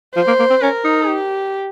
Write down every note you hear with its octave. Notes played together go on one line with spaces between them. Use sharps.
F3 C5
A#3
A#3
C4
C#4 A#4
D#4
G4